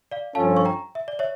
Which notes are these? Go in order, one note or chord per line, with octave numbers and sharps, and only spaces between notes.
D5 F5
G2 F3 C#4 F4 A4 F5 A5
C#6
G5 A#5
E5
D5
C#5 E5